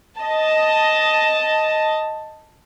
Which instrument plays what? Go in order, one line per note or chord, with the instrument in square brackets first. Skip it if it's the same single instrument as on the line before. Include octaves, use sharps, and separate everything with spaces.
[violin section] D#5 A5